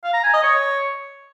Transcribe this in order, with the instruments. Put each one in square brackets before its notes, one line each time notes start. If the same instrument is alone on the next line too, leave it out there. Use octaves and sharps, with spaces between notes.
[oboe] F5
A#5
G#5
D#5
C#5